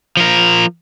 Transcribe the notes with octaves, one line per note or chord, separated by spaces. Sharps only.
F3 A#4